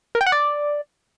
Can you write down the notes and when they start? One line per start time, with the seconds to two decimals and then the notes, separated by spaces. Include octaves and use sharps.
0.15 A#4
0.21 G5
0.26 F#5
0.32 D5